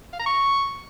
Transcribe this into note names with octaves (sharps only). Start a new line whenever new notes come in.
F5
A#5
C#6